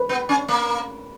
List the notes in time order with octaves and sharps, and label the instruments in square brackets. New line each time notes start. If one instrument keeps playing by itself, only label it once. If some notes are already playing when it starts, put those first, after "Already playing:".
Already playing: [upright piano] B4
[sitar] B3
C#4
A#3